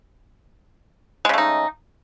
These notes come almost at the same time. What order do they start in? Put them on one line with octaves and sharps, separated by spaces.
G#3 C#3 A3 D#4